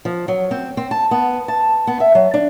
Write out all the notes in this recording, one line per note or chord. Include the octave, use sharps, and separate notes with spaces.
F3
F#3
C4
C4
A5
B3
A5
B3
E5
F#3
D4